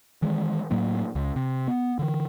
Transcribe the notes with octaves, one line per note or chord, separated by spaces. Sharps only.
D#3 E3 G#3
A2 F#3 A#3
C#2
C3
B3
D3 E3